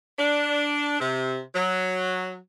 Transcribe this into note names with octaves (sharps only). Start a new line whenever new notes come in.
D4
C3
F#3